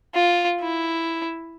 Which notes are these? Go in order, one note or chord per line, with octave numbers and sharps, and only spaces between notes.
F4
E4